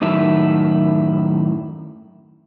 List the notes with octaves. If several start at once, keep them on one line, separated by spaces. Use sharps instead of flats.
F#2 A2 D#3 E4